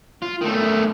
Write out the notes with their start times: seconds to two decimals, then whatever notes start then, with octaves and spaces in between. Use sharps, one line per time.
0.22 F4
0.41 D#3 A3